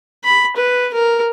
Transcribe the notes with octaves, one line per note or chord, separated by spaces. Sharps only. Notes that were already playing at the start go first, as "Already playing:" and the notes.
B5
B4
A#4